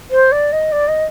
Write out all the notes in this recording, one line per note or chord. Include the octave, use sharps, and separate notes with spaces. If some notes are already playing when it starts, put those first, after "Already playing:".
C5
D5
D#5
D5
D#5